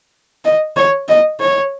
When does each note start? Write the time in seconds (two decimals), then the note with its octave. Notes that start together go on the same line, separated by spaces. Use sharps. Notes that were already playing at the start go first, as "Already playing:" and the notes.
0.45 D#5
0.77 C#5
1.08 D#5
1.40 C#5